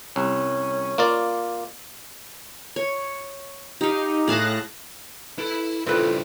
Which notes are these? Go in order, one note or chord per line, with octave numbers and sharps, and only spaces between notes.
C2 C#4
A#3 F4 D5
C#5
D#4 G4 F5
A2 G#4 F5 A5 F#6 A#6
E4 A4 B4 B5
G2 C#3 C4 E4 F4 A4 B4 D5